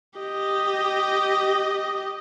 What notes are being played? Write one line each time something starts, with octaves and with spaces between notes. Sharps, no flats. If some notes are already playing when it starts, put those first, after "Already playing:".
G4 D#5